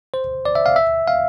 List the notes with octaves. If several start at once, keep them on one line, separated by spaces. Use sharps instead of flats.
C5
D5
E5
F5
E5
F5